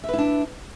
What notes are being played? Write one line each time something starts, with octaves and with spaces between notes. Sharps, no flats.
D4 E4 B4 E5